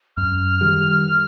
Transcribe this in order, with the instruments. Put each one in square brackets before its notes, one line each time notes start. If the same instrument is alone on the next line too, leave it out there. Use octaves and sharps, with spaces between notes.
[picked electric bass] F#2 [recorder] F6
[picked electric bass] D#3 G3